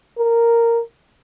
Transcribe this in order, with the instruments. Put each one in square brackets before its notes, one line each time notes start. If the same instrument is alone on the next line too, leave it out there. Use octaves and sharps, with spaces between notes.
[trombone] A#4